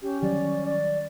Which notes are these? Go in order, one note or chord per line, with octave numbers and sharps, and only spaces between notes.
C#4 G4
D#3 F#3 G3 D5
D5